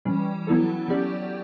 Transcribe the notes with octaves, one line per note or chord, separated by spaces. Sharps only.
E3 G3 C#4
F#3 B3 E4 A4
F#3 C#4 G4 D5